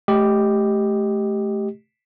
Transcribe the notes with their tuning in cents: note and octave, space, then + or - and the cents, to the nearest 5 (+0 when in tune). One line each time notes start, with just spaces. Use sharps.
A3 -25 G4 +0 D#5 +0